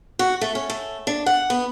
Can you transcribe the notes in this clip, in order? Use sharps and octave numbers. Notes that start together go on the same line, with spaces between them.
F#4
A3
C#4
A3
D4
F#5
B3